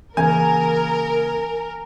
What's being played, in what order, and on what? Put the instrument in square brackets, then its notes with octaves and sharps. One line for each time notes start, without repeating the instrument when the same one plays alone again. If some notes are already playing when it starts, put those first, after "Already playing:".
[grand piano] C#3 A#3 [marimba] E3 [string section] A#4 [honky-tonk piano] G#5